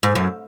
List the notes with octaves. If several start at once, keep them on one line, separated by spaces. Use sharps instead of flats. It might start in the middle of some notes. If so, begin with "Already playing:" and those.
G#2
F#2